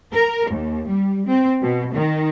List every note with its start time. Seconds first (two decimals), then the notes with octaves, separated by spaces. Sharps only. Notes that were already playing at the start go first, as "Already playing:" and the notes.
0.13 A#4
0.51 D#2
0.88 G3
1.27 C4
1.62 B2
1.95 D#3